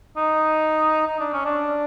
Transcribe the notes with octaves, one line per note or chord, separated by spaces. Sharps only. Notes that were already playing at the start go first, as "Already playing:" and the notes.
D#4
D#4
D4
C#4
D4